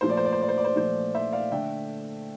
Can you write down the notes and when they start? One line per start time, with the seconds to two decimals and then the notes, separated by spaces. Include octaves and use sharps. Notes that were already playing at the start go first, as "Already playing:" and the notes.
0.01 A#2 F3 A3 C5
0.10 D5
0.17 C5
0.25 D5
0.32 C5
0.42 D5
0.48 C5
0.58 D5
0.64 C5
0.76 A#2 F3 A3 C5
1.15 C5 E5
1.32 D5 F5
1.52 D3 A3 D4 E5 G5